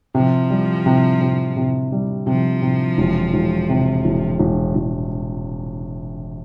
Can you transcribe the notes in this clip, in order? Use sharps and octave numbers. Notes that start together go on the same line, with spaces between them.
C3 F3
G3
C3
C3
C3
G3
C3 F3
C3
E1
E1
C3
E1
E1
E1